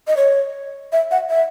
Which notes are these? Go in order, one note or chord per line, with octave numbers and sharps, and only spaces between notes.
D#5
C#5
E5
F#5
E5